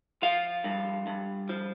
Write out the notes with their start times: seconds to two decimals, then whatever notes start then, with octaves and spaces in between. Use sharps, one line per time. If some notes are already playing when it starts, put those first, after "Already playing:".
0.22 F3 F4 F5
0.64 G2
1.07 G2
1.49 F3